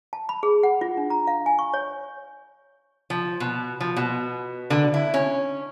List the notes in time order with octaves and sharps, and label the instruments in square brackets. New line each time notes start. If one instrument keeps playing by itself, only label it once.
[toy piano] A5
B5
G#4
F#5
F4
D4
A#5
F5
G#5
C#6
C#5
[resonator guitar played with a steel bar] F3
B2
F3
B2
D3
E4
C#4